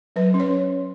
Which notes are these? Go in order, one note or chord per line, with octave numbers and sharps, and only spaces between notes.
F#3 B4
C#4
C#5